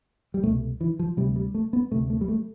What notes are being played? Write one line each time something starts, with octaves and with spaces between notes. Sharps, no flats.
G3
C2 B2 A3
E3
F3
D2 C3 G3
G3
A3
B3
D2 C3 A3
A3
G3
A3